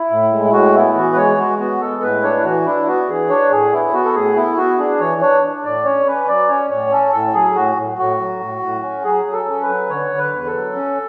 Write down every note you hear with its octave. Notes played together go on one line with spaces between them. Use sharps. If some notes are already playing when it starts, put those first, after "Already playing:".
Already playing: E4
A2
G#3
E4
A2 F#4
B3 E4
E3 F#4
B4
G#3 C#5
G#3 F#4
B3 F#4
G#3 A4
A2 B4
D4 C#5
E4
E3 F#4
D4 E4
B3 F#4
E3 G#4
D4 C#5
A2 G#4
B3 E4
B3 F#4
A4
A2 G#4
B3 E4
B3 F#4
D4 G#4
E3 C#5
D4 C#5
D4
A2 D5
C#4 C#5
C#4 B4
F#3 D5
C#4 C#5
A2 C#5
C#4 A4
A2 A4
F#3 G#4
A2 F#4
A2
A2 F#4
F#3
A2
A2
C#4
F#3 G#4
F#3
A4
C#4
B4
F#3
D3 C#5
D3
B4
E2
A4
F#3
C#4